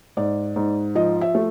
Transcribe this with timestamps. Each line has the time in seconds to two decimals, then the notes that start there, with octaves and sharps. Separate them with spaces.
0.17 G#2 D5
0.56 G#2
0.95 F3 D#5
1.21 E5
1.35 A3